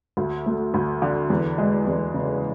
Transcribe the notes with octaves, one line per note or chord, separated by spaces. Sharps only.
D2
A3
D2
D3
E2
G#3
E2
C#3